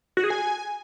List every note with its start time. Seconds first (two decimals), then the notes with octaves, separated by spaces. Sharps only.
0.17 F#4
0.24 G#4
0.30 G#5